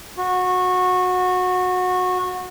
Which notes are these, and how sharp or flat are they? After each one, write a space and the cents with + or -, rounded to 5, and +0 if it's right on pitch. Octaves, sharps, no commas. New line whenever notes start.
F#4 -20